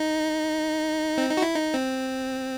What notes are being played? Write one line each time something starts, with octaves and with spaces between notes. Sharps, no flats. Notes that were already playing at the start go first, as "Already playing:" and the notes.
Already playing: D#4
C4
D#4
F#4
E4
D#4
C4